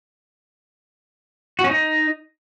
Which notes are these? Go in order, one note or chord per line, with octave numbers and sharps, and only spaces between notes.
F#4
C#4
D#4